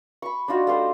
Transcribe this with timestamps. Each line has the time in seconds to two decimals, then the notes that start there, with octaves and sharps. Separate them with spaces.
0.22 B5 C#6
0.48 D4 D#4 F4 F#4
0.67 A3 F4 G4 C5